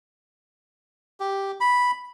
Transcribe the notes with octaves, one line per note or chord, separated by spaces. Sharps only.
G4
B5